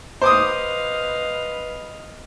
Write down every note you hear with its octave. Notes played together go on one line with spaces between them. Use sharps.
B4 C5 D#5 F5 D6 D#6